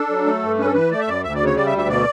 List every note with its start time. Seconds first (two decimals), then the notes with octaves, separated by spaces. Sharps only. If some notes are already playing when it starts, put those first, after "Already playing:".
Already playing: D4 A4
0.09 F#3
0.26 A3
0.42 G2
0.58 C#4 B4
0.65 A4
0.74 E3 B4
0.91 A3 D5
1.00 E5
1.07 F#2 D5
1.23 D2 E5
1.35 D5
1.40 C#3
1.46 C#5
1.56 G3 D5
1.67 E5
1.72 D2
1.78 E5
1.89 B2 D5